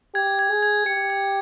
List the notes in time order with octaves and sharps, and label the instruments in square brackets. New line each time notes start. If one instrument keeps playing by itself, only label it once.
[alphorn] G4 [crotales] G#6
[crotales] G#6
[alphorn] G#4
[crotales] G#6
[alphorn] G4 [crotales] C#7
[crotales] G#6